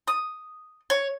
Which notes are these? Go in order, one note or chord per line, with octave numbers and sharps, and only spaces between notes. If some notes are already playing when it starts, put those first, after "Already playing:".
D#6
C#5